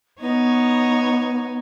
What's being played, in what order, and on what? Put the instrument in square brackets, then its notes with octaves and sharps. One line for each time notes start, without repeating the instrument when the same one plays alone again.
[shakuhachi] B3 [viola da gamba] D#4 C#5